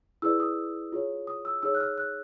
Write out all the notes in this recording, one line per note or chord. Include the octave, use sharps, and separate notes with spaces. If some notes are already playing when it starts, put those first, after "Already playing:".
E4 G#4 B4 D5 E6
D#6
F4 G#4 C#5
D#6
E6
D#4 G#4 C#5 E6
F#6
F6
F#6